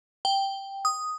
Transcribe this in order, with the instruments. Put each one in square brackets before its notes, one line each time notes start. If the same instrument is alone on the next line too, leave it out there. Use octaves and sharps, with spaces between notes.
[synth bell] G5
D#6